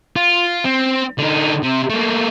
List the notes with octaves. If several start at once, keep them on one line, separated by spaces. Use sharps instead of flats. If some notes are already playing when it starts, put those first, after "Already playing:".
F4
C4
D3 D#4
C3
A3 A#3